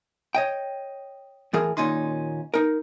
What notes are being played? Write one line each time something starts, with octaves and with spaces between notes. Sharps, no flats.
C#5 D#5 G5
A2 E3 G#4 A#4
D#2 A#2 C#4 D#4 C6
D#4 A#4